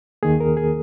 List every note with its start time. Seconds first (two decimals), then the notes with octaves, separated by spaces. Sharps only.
0.23 D#2 D#3 A#3 G#4
0.40 A#4
0.57 G#4